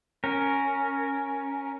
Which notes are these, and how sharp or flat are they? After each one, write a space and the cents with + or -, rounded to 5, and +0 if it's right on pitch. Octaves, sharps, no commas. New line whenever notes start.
C#4 +0 A#4 +0